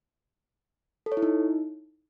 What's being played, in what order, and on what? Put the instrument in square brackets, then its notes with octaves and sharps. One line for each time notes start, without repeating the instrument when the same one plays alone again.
[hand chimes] A4
C#5
E4
D#4